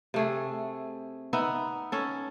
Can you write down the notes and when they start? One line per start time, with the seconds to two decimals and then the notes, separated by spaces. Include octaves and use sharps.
0.14 C3 A3 G#4
1.33 B3 D#4 E5
1.92 C#4 A4